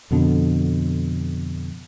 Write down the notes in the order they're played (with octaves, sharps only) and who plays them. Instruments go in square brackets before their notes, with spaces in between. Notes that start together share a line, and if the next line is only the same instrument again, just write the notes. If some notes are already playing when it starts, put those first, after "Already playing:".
[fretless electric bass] F2 B2 D3